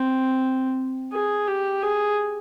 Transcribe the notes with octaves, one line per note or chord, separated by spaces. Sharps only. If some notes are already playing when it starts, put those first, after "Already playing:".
Already playing: C4
G#4
G4
G#4